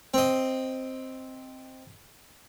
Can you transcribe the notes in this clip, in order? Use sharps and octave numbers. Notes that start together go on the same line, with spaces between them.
C4 D#5